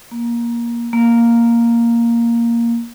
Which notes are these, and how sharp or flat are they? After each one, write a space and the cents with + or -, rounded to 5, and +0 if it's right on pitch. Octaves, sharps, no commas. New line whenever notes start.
A#3 +15
A#3 +0